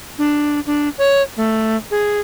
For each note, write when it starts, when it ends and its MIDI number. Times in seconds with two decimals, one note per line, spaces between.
0.18 0.60 62
0.66 0.89 62
0.98 1.22 73
1.37 1.76 57
1.91 2.20 68